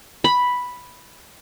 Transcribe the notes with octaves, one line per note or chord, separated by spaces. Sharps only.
B5